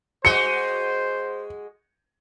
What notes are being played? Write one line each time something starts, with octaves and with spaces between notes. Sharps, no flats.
G#3 F#4 C5 D#5 C#7